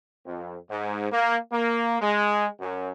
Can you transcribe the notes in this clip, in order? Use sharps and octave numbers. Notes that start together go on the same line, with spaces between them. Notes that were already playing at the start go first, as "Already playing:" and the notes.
F2
G#2
A#3
A#3
G#3
F#2